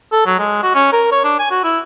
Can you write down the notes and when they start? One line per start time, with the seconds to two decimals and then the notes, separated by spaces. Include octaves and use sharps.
0.12 A4
0.26 F#3
0.39 G#3
0.63 F#4
0.75 C#4
0.93 A#4
1.12 C#5
1.24 D4
1.39 G#5
1.51 F#4
1.64 E4